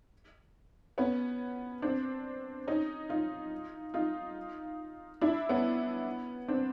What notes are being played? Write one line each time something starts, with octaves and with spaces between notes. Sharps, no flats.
B3 C#4
C4 D4
C#4 D#4
D#4 F4
D#4 F4
D4 E4
B3 C#4
C4 D4